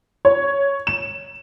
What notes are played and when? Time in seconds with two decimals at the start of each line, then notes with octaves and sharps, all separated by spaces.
0.25 C#5
0.87 E7